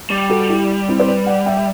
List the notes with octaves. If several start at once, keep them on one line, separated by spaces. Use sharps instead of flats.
G3
F#4 A4
E4 G4
C4 E4
C5
B4 D5
D5 F#5
E5 G5
E5